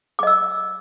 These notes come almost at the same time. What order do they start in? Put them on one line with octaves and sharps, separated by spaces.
D6 D#5 E6